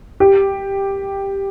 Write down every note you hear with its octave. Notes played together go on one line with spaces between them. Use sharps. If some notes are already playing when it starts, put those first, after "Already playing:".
G4